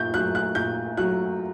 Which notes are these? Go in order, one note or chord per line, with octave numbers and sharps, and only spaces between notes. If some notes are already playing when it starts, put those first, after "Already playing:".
Already playing: A#2 G6
F#3 A3 F#6
F#6
A#2 G6
F#3 A3 F#6